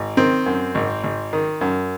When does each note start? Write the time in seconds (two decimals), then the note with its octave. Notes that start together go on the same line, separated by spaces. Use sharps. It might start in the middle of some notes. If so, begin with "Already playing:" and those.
Already playing: G#1
0.17 D#3 C4
0.46 F#2
0.75 G#1
1.04 G#1
1.33 D#3
1.61 F#2